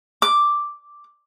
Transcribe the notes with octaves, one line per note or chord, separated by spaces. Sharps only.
D6